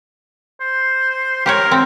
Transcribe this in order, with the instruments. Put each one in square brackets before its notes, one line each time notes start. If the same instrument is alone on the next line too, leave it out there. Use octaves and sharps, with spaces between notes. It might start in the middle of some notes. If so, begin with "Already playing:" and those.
[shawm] C5
[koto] G4 C5 C#5 [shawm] A#4
[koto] C4